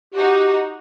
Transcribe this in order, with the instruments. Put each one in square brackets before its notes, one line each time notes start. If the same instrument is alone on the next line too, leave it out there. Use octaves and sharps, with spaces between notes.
[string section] D#4 F#4 [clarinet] G4